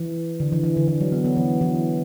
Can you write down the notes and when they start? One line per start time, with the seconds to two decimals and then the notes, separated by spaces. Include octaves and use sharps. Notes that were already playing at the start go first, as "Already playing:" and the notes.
Already playing: E3
0.40 D3
0.52 E3
0.64 E3
0.77 D3
0.88 E3
1.01 F#3
1.12 B3
1.25 B3
1.37 E3
1.61 E3